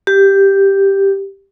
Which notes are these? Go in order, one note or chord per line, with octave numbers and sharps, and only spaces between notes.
G4